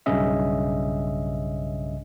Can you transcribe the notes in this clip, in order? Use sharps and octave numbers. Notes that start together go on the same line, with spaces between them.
B1 G2 C#3 C#4 D#5 E5